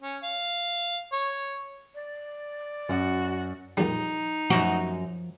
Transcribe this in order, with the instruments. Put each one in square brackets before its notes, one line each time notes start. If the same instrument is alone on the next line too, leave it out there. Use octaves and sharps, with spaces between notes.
[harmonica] C#4
F5
C#5
[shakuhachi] D5
[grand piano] F#2 [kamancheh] F#4
[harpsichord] A#1 G3 [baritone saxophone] D#4
[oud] F#2 F#4 [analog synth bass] F3